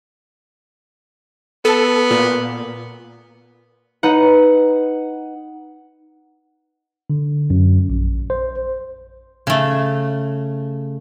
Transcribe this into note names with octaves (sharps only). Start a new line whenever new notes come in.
B3 A4
A#2
D#4 B4 F#5
D3
F#2
A#1
C5
C#3 A3